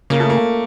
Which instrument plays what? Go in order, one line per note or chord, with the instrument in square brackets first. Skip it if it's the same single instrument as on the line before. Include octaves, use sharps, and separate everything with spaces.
[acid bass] C#3 [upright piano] A#3
[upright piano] A3
A#3